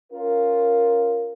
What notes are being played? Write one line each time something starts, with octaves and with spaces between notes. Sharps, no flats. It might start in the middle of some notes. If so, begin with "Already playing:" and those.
C#4 F4 A#4